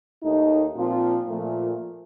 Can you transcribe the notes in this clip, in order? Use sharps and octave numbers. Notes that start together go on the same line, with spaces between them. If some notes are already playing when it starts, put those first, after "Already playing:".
D#2 D#3 A3 D#4
A#2 F3 C4 F4
A#2 F3 A3